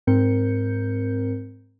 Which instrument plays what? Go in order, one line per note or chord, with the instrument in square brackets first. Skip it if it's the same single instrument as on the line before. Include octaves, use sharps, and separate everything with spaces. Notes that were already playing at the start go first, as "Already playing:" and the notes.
[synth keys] G#2 C4 A#4 G6 C#7